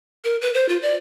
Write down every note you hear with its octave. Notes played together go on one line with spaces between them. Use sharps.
A#4
B4
C5
F4
D5